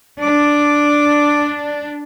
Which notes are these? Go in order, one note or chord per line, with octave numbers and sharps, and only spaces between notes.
D4 D6